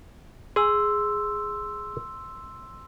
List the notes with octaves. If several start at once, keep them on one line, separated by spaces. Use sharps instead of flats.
G#4 C6 E6